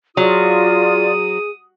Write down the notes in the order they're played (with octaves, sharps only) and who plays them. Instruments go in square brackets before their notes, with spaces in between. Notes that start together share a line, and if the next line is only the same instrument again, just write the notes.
[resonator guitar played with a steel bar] F#3 [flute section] F4 D5 [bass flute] G#4 [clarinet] D#6